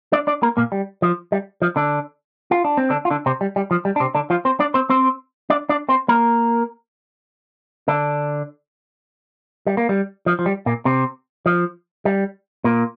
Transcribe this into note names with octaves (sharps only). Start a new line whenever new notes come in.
D4 D5
D4 D5
A#3 A#4
A#2 A#3
G3
F3
G3
F3
D3 D4
F4
D4
C4
D3 D4
F4
D3 D4
C3 C4
G3
G3
F3
G3
D4
C3 C4
D3 D4
F3 F4
C4 C5
D4 D5
C4 C5
C4 C5
D4 D5
D4 D5
C4 C5
A#3 A#4
D3 D4
G3
A#3
G3
F3
F3
G3
A#2 A#3
C3 C4
F3
G3
A#2 A#3